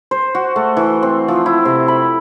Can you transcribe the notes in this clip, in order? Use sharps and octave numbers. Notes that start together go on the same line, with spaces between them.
C5
F#4
A3
E3
C4
F3
E4
C3
B5